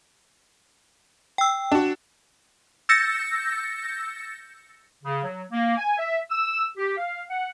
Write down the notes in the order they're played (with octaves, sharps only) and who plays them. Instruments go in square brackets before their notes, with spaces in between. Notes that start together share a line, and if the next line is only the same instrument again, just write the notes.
[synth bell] G5 E6
[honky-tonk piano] D4 F#4
[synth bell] E6 G6 A6 A#6 C#7
[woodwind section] C#3
F#3
A#3
G#5
E5
E6
G4
F5
F#5